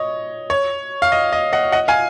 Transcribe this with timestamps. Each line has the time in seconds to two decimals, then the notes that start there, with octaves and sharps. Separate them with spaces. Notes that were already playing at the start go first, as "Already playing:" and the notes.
Already playing: C#5 D#5
0.50 C#5
1.02 F5
1.12 D#5
1.32 D#5
1.53 D#5 F#5
1.72 D#5 F#5
1.88 F5 G#5